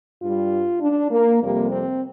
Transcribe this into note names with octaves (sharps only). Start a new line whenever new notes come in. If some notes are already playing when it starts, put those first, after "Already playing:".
G2 G3 F4
D4
A#3
F2 C3 G3 A#3
C4